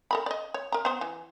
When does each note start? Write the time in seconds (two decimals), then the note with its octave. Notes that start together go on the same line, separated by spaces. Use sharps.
0.11 A4 A#4 B5
0.26 D5 D#5
0.54 C#5
0.72 A#4 A#5
0.85 B3 C5
1.01 E3